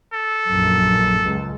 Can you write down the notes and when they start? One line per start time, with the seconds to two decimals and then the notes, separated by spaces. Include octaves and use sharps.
0.13 A4
0.50 A#1 F#2
1.25 C#2